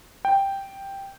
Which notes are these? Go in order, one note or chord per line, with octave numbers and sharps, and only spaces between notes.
G5